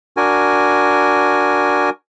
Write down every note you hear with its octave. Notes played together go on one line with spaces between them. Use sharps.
D4 F#4 A#4 G#5